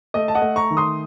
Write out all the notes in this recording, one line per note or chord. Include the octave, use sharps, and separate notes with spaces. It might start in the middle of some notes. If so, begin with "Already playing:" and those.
A3 D#5
A5
D#5 F#5
A3
A#5 C#6
D#3
C6 D#6